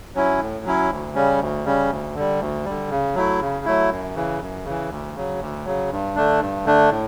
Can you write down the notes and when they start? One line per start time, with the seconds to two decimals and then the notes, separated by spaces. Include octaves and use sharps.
0.15 F#3 C#4 E4
0.40 A2
0.65 F#3 C#4 E4
0.90 D2
1.15 C#3 G3 C#4
1.40 D2
1.65 C#3 G3 C#4
1.90 D2
2.15 D3 G3
2.40 D2
2.65 D3 G3
2.90 C#3
3.15 F#3 A3 E4
3.41 C#3
3.65 F#3 A3 E4
3.90 F#2
4.15 C#3 E3
4.41 F#2
4.65 C#3 E3
4.91 D2
5.15 C#3 F#3
5.41 D2
5.65 C#3 F#3
5.91 G2
6.16 D3 A3 D4
6.41 G2
6.65 D3 A3 D4
6.90 A2